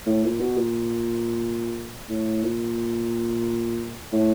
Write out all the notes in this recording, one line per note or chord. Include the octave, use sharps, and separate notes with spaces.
A2
A#2
B2
A#2
A2
A#2
A2